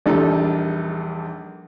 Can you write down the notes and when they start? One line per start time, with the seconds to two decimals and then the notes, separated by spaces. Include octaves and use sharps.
0.06 A#1 E2 G3 D#4 A4